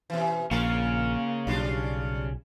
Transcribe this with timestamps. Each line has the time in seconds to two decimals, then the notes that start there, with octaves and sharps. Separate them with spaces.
0.10 B2 E3
0.51 A#1 C#3 A#3 F4 A#4
1.47 B1 G3 D4 F4